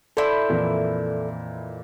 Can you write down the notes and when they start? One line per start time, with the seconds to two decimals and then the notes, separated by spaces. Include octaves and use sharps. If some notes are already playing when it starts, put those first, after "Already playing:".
0.17 E4 A4 C5 D5
0.49 F2 A#2 E3